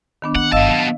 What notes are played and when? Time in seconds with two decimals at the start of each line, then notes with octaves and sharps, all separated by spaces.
0.22 D#3 B3 D4
0.35 A#3 F#5
0.52 G1 B2 D#5 F5 A5 E6
0.68 F#3